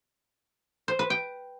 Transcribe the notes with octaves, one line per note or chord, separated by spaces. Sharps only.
C5
B4
G5